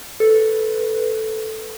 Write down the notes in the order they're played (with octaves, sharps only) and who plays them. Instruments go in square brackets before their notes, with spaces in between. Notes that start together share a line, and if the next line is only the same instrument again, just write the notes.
[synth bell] A4 [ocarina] B4